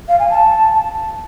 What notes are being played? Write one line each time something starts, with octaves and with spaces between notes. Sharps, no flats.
F5
G#5
A5